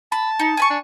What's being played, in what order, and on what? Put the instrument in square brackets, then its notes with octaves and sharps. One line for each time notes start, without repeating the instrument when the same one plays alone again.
[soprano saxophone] A5 [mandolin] B5
[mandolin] D#4
G#5 B5 C#6
[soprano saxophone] D4